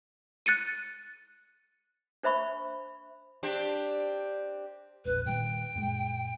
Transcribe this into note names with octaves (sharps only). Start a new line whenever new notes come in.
F#6 A6 C#7 D#7
D4 C5 E5 B5 C#6
C4 D4 G4
E1 A#1 B4
A#2 D#3 G3 G5
F#2 A#2 G#3